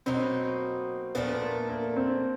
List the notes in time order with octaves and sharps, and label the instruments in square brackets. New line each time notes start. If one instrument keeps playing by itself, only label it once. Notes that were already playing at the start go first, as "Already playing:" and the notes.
[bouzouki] B2 F#3 A#3 D#4 [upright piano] C4
[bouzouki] A#2 F3 A3 D4 [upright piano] B3
[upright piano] A#3
A#3
C4